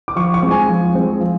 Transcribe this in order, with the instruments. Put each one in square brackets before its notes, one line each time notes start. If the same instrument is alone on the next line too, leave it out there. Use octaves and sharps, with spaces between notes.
[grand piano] D6
F3 C#6
C#6
G#3 C4
G#5
F3
G#3 C4
F3